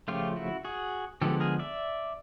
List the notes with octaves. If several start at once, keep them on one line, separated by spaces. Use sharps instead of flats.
C#3 F3 A3 F4 G4
E4 F#4
F#4 G#4
D3 F3 G#3 B3 G4 A4
G#4 A#4
D5 E5